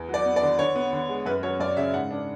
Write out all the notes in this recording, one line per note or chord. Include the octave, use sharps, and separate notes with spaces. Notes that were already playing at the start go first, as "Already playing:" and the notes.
Already playing: E2
F#3
D5
B3
D5
D3
D3 C#5
B3
D3
G#3
F#2 B4
F#3 C#5
F#2 D5
C#3 E5
G#2 F#5
D4